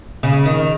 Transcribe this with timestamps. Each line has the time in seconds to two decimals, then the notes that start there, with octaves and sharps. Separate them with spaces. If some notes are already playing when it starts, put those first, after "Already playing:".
0.23 C#3
0.45 D#3